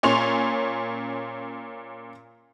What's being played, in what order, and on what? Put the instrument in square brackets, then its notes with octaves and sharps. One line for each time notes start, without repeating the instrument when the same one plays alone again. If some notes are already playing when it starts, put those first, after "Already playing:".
[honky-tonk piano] A#2 C#4 C6 C#6 F7